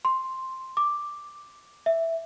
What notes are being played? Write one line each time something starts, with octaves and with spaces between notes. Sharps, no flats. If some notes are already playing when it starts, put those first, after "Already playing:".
C6
D6
E5